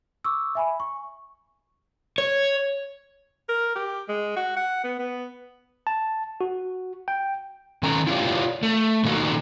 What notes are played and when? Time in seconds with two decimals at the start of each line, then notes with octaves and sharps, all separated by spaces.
0.24 C#6 D6 E6
0.55 E5 G#5 B5
0.80 C#6
2.18 C#5
3.49 A#4
3.75 G4
4.08 G#3
4.36 F#4
4.56 F#5
4.84 B3
4.99 B3
5.87 A5
6.41 F#4
7.08 G5
7.83 D#3 C#4 A4 A#5
8.07 E4 F4 G4 C#5 D5
8.63 A3
9.04 A#2 D#3 A3 D#4 F#4 A4